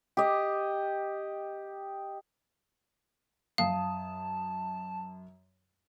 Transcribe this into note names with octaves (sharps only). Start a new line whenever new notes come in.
G4 D#5
F#2 F5 A5 D#6